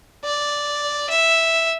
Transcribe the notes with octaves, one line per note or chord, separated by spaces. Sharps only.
D5
E5